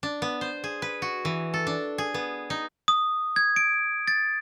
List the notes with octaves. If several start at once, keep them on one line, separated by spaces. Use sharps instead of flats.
D4
B3
C5
G#4
B4
F#4
E3
A4
D4
G#4
B3
D#4
D#6
G#6
D7
A6